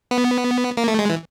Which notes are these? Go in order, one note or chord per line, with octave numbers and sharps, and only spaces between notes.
B3
A#3
A3
G#3
E3